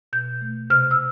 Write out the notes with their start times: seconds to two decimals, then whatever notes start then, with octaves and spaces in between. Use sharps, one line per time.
0.13 B2 G6
0.42 A3
0.70 C3 F6
0.91 E6